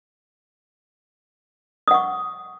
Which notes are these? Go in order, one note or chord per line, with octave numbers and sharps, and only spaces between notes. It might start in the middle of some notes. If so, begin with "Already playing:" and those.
F#5 C#6 D#6